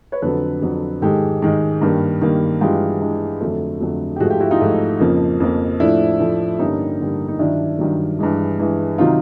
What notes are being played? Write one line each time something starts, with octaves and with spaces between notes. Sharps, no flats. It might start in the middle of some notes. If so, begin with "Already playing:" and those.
B4 C#5
F2 D3 F#3 A4 B4
F2 D3 F#3
G#2 D#3 G#3 G4 A4
G#2 D#3 G#3
G2 D#3 G3 A#3
G2 D#3 G3 A#3
G2 E3 G#3 F4 G4
G2 E3 G#3
F2 D3 F#3 A3
F2 D3 F#3 A3
G4
G#2 F3 A3 F#4 G#4
F4 G4
E4 F#4
D#4 F4
G#2 F3 A3
F2 C#3 F3 A#3
F2 C#3 F3 A#3
A2 F3 A3 D4 E4
A2 F3 A3
G2 D3 G3 A#3 C#4 D#4
G2 D3 G3 A#3
D#4
G2 D#3 F#3 D4 E4
G2 D#3 F#3
G2 E3 G#3
G2 E3 G#3
C3 D#3 F#3 D#4 F4